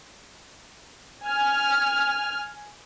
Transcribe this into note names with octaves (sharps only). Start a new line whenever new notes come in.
G#5 F6